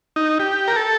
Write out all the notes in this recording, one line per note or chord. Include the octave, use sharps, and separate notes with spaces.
D#4
G4
A#4
A4